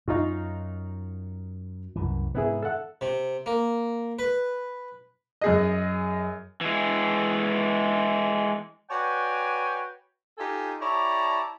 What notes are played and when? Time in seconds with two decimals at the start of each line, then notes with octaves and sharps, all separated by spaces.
0.08 F#2 D#4 F4 F#4
1.96 C2 F#2 E3
2.35 G#2 C3 B3 E4 G#4
2.63 A4 E5 F#5
3.01 C3
3.46 A#3
4.19 B4
5.41 F#2 G#4 D#5
6.61 E3 G#3
8.89 F#4 B4 C#5 D5 G5 G#5
10.38 D#4 F4 G4 A4 G#5
10.81 E4 G4 C#5 D5 A5 A#5